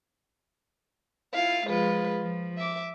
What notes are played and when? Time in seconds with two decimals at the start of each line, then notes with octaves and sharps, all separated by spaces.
1.33 E4 F4 F5
1.68 F3 G#3 F4 B4
2.22 F3
2.56 E5 D6